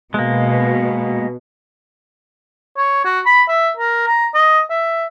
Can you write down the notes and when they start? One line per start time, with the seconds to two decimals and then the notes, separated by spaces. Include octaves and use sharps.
0.14 B2 G#3 A#3
2.77 C#5
3.05 F#4
3.26 B5
3.49 E5
3.77 A#4
4.07 A#5
4.34 D#5
4.70 E5